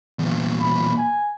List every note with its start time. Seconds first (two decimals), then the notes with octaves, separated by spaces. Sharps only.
0.19 E2 A#2
0.61 B5
0.97 G#5